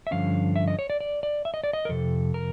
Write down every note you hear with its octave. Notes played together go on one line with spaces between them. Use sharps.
E5
G2 D3 F3 C#4 F5
E5
D#5
C#5
D5
D5
D5
E5
D#5
D5
D#5
A#4
F2 C3 A4
A#4